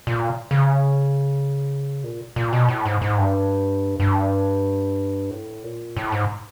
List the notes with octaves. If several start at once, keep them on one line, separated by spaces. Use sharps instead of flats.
A#2
C#3
A#2
A#2
B2
A2
G#2
G#2
G2
G2
A2
A#2
A2
G#2